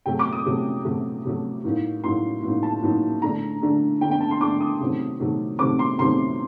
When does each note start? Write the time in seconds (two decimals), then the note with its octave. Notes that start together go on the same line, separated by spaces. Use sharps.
0.06 C3 F#3 A3 G5
0.19 D6
0.33 D#6
0.46 C3 F#3 A3
0.85 C3 F#3 A3
1.24 C3 F#3 A3
1.64 A2 F#3 A#3 D#4
2.04 A2 F#3 A#3 D#4 C6
2.43 A2 F#3 A#3 D#4
2.63 A5
2.82 A2 F#3 A#3 D#4
3.22 D3 A3 D4 A#5
3.62 D3 A3 D4
4.01 D3 A3 D4 G5
4.11 G5
4.21 A5
4.31 C6
4.41 D3 A3 D4 D6
4.61 D#6
4.80 C3 D#3 F#3 A3 C4
5.20 C3 D#3 F#3 A3 C4
5.59 C3 D#3 F#3 A3 C4 D6
5.79 C6
5.99 C3 D#3 F#3 A3 C4 C6